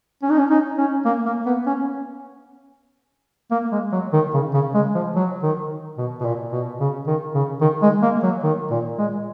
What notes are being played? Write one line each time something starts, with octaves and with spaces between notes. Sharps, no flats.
C#4
D#4
C#4
D#4
C#4
A#3
A#3
B3
C#4
A#3
G#3
F#3
D#3
C#3
C#3
G#3
F3
F#3
D#3
B2
B2
A#2
B2
C#3
D#3
C#3
D#3
G#3
A#3
F#3
D#3
A#2
G#3